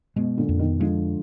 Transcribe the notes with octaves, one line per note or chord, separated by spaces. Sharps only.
B2 G#3
A#2 D3
F2
B2 D#3
D3 F3 G#3